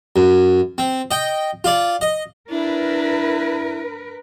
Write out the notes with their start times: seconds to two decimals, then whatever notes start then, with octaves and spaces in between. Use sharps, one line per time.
0.16 F#2
0.78 C4
1.11 D#5 G5
1.64 F4 D5
2.01 D#5
2.50 D4 E4 A#4 B4